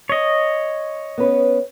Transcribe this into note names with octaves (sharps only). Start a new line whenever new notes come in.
C#5 D#5
B3 C#4 B4